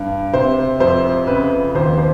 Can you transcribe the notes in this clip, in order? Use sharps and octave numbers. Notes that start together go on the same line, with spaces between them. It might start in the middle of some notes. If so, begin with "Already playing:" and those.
Already playing: G2
C3 C5
F2 C5
C#3 B4
D#2 C5
C5